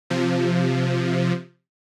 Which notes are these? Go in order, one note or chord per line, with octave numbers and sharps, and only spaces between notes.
C3 F3